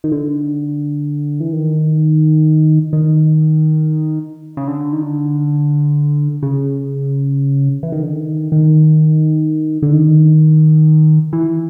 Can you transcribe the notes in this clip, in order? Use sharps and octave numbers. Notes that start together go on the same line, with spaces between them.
D#3
D3
E3
D#3
D#3
C#3
D3
D#3
D3
C#3
E3
D#3
D3
D#3
D#3
D3
D#3
E3